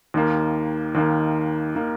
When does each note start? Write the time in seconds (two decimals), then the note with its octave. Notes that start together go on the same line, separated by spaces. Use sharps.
0.14 D#2 D#3 A#3
0.95 D#2 D#3 A#3
1.75 D#3 A#3